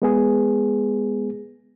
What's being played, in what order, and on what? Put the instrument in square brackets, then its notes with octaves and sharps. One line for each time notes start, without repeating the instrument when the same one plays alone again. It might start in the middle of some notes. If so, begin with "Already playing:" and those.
[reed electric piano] G#3 B3 G#4